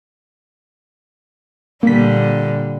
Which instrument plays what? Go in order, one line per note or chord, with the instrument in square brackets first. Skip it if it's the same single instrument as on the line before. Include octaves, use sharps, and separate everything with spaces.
[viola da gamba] A#2 D3 G3 [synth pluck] A#3 B6